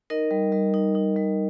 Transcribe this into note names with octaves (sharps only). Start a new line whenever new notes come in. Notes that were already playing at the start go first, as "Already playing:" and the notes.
D#4 A#4 D#5
G3
G3
D#4
D#4
G3